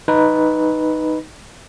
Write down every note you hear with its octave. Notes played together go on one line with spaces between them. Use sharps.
D#4 B4